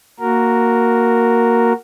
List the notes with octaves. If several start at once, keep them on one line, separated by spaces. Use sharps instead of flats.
A#3 F#4 A#4